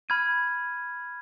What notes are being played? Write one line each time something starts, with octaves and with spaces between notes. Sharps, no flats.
B5 F6 G#6 D#7